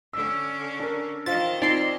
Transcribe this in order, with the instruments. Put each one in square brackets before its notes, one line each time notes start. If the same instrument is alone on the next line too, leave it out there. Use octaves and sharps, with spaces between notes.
[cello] D3 C#4 [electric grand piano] E6
[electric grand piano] D4 A#4
[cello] D#3 D#5 [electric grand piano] F4 C5 F5 [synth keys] A6
[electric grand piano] C4 [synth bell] D#4 F4 [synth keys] D5 C6